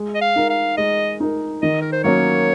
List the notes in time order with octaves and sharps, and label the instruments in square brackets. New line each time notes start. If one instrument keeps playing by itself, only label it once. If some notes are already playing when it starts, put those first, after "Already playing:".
Already playing: [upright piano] G#3
[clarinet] D#5
F5
[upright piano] D#4 A#4
[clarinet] F5
[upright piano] G#3 [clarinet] D#5
[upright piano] D#4 A#4
[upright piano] D#3 [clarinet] D#5
[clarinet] A#4
C5
[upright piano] F#3 A#3 C#4 [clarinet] C#5